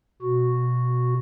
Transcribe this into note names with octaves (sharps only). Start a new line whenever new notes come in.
B2 F#4